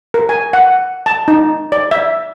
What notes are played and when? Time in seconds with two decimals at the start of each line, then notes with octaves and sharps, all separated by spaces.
0.14 A#4
0.29 G#5
0.53 F#5
1.06 A5
1.28 D#4
1.72 D5
1.91 E5